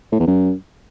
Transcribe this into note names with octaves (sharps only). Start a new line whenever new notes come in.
A2
E2
F#2